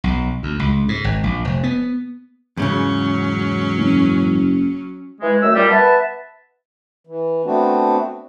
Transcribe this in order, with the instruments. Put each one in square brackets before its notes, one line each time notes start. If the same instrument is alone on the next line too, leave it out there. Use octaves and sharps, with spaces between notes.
[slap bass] B1
D2
C#2
G#2
G#1
A#1
F1
B3
[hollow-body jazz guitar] E2 G#2 C#3 [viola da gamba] F#3 C#4
[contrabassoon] F#1
[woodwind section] E3 G#3
F#2 D#3 A3 E6
A#2 G3
B3 B4 E5 A5
[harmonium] E3
A3 B3 C4 D4 F#4